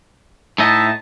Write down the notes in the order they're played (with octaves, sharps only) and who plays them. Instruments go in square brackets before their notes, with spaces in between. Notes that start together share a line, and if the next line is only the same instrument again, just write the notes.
[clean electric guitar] A2 D#4 D#5 [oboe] E5 [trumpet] A5